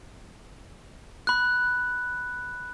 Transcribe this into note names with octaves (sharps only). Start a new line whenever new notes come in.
B5 F#6